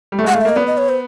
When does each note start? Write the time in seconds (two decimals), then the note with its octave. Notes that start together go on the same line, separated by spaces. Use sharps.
0.12 G3
0.19 A3
0.24 G#3 F#5
0.34 A3 F5
0.41 E5
0.45 A#3 D#5
0.56 B3 D5
0.67 D#5
0.78 C#5
0.89 C5